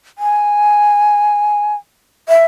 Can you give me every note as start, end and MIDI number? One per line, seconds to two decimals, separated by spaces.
0.18 1.74 80
2.29 2.45 76